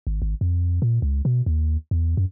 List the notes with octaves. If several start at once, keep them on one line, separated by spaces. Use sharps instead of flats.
G#1
G#1
F2
A#2
C#2
B2
D#2
E2
F#2